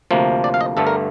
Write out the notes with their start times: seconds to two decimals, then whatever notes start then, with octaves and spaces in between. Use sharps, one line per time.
0.11 D2 C3 F3 A#3
0.44 D5
0.54 F5
0.61 D#5
0.77 G1 G2 D3 A3 A4
0.87 A#4